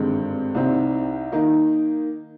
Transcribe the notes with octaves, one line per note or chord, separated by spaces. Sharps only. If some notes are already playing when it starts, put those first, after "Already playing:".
Already playing: G#1 G2 D3 G#3 C4
C2 C3 G3 C4 D#4
D#3 A#3 D#4